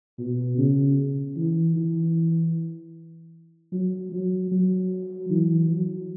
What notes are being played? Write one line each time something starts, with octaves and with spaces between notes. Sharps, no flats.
B2
C#3
E3
E3
F#3
F#3
F#3
E3
F#3